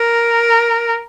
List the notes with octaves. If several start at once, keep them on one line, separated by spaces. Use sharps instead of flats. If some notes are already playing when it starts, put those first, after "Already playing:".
Already playing: A#4